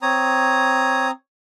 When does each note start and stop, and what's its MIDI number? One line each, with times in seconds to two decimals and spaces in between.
0.02 1.11 60
0.02 1.08 73
0.02 1.11 82
0.02 1.11 87